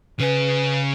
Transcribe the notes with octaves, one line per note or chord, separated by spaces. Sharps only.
C#3 G#4 B4